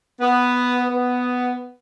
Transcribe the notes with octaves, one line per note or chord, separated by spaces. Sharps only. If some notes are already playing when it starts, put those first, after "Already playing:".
B3
B3